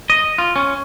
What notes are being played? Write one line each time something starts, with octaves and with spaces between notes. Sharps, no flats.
D#5
F4
C#4